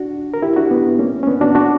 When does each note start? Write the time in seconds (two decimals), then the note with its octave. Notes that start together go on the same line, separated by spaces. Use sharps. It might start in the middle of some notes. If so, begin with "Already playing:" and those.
Already playing: D4 F#4
0.34 A#4
0.42 E4 G4
0.56 D4 F#4
0.71 B3
0.99 A#3 C#4
1.23 C#4
1.27 B3 D4
1.41 D4 F#4
1.55 D4 F#4